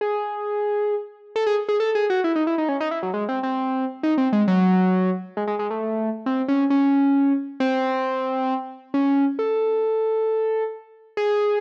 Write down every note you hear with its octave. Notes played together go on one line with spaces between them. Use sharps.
G#4
A4
G#4
G#4
A4
G#4
F#4
E4
D#4
E4
D#4
C#4
D#4
E4
F#3
G#3
C4
C4
D#4
C4
G#3
F#3
G#3
G#3
G#3
A3
C4
C#4
C#4
C4
C#4
A4
G#4